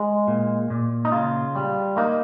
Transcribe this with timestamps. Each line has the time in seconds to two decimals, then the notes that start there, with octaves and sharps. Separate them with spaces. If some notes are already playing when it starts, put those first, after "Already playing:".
Already playing: G#3
0.28 A#2
0.70 A#2
1.05 D#4
1.12 C#3 F4
1.56 G3
1.97 A#3 D#4